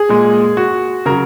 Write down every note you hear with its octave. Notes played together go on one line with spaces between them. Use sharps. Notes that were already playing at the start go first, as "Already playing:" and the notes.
Already playing: G#4
A#2 G#3
F#4
C#3 F#3 A#4